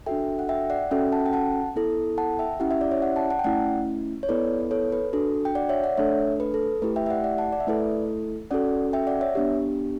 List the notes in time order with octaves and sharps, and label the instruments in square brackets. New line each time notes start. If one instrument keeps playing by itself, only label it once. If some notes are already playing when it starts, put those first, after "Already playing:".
[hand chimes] D4 F#4 A4 E5 G5
F#5
E5 G5
D5 F#5
C#4 F#4 A4 E5 G5
F#5 A5
G5
F#5 A5
B3 E4 A4
F#5 A5
E5 G5
C#4 E4 G4 F#5
E5
D5
C#5 E5
D5 F#5
F#5 A5
F#5 A5
G5
A3 C#4 E4 D5 F#5
C#5
B3 E4 A4 B4 D5
B4
A4 C#5
B4
D4 F#4 A4
G5
D5 F#5
C#5 E5
D5 F#5
A3 D4 A4 C#5 E5
B4
A4
A3 E4 G4 B4
E5 G5
E5
D5 F#5
D5 F#5
F#5 A5
D5
E5
A3 E4 A4 B4 D5
C#4 F#4 A4 D5 F#5
E5 G5
D5 F#5
C#5 E5
B3 D4 G4